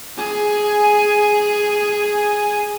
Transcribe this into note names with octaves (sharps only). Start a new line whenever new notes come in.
G#4 G#5